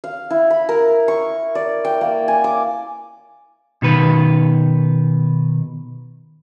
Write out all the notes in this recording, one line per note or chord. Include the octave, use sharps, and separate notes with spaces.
F5
E4
B5
A#4
C#6
D5
G5
A#3
G#5
D6
B2 D#3 B4